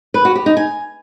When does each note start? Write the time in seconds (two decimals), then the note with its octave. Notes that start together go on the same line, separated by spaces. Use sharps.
0.14 B4
0.25 F#4
0.35 G4
0.46 D#4
0.57 G#5